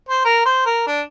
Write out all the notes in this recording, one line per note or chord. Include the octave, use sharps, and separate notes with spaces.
C5
A#4
C5
A#4
D4